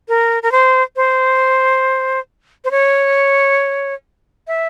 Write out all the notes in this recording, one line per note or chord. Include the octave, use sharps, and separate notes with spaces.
A#4
A#4
C5
C5
C5
C#5
E5